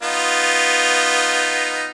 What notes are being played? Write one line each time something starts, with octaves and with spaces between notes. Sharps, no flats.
B3 D#4 F4